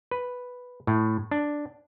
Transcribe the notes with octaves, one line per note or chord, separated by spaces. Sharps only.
B4
A2
D4